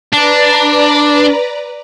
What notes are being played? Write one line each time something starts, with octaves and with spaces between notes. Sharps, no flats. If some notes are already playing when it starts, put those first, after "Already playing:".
D4 B4 D5 A#5